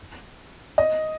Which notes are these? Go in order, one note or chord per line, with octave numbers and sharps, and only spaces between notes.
D#5